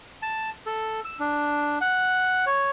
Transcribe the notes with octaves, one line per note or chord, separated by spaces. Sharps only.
A5
A4
E6
D4
F#5
C#5